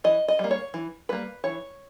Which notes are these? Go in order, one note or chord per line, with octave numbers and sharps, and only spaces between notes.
E3 D#5
D#5
G3 A#3
C#5
E3
G3 A#3 B4
E3 C#5